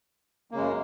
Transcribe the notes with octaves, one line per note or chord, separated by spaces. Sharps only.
F#2 C#3 G#3 A#3